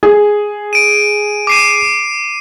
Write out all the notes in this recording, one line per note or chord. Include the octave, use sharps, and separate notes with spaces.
G#4
D7 D#7
D6 C7 D#7